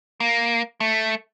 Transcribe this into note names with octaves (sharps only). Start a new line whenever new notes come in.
A#3
A3